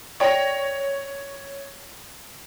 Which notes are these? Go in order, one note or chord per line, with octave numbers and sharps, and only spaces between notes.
C#5 D5 G5 A#6